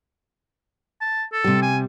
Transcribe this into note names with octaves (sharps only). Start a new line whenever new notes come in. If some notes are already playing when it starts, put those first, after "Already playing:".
A5
A4
C3 G3
G#5